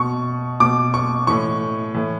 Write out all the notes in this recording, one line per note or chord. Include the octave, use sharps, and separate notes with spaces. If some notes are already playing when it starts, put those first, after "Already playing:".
Already playing: B2 C#6
B2 D6
C#6
A2 E3 C#6
A2 E3